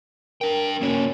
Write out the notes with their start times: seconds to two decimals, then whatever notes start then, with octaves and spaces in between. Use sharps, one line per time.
0.41 D4 A#4 G5
0.81 A#3 C#4 F#4